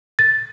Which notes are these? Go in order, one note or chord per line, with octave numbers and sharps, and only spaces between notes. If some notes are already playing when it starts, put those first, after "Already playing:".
A6